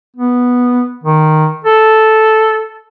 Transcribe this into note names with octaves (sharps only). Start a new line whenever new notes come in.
B3
D#3
A4